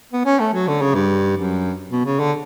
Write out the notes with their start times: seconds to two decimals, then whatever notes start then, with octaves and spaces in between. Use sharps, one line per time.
0.12 B3
0.26 C#4
0.40 A3
0.54 F#3
0.68 D3
0.82 C#3
0.95 G2
1.37 F#2
1.91 B2
2.06 C#3
2.20 D3